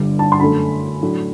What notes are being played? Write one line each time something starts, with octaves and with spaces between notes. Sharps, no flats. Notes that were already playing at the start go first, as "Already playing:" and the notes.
Already playing: G1 G2 D3 G3 D4
A5
C6
F#2 D3 A3 B5
A2 F#3 A3 D4